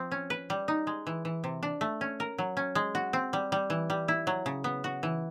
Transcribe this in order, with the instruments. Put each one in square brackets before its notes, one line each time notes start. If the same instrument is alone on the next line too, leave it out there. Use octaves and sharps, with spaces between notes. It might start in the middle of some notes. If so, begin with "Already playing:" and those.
Already playing: [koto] F3 C4
C#4
B4
G3
D#4
G#3
E3
E3
C3
D4
A3
C#4
A#4
F#3
C#4
G#3
F#4
C4
G3
G3
E3
G3
E4
F#3
C#3
B3
F#4
E3